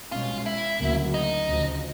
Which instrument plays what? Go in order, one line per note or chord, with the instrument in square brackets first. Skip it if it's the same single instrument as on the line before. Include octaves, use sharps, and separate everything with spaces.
[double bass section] B2 G#3 C#4 [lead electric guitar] F4
[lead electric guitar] E4
[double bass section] D2 C#3 F#3 A#3
[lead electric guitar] D#4
[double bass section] D2 C#3 F3